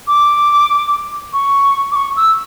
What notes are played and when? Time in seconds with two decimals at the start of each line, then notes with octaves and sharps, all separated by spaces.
0.08 D6
1.33 C#6
1.92 D6
1.95 C#6
2.17 E6